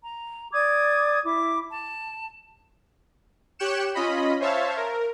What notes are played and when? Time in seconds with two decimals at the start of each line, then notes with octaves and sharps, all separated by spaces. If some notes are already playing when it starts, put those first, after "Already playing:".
0.04 A#5
0.53 D5 D6 D#6 G#6
1.23 E4 D6
1.71 A5
3.59 G4 C#5 G5 F#6 C#7 E7
3.95 C#4 F4 D#5 B5
4.40 C5 C#5 E5 F5 A5
4.77 A#4